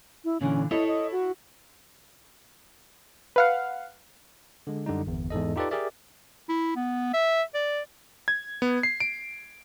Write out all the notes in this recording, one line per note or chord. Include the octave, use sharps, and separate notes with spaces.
E4
A#2 D3 E3 C#4
E4 A4 C#5 D#5
D#5
F#4
B4 F5 F#5
D3 G#3
F#2 D3 G3 D#4
G1 E2
E2 G#2 A4 D#5
D#4 F4 G4 A4 B4 D5
G4 G#4 A#4 D5 E5
E4
B3
E5
D5
G#6
B3
C7
D7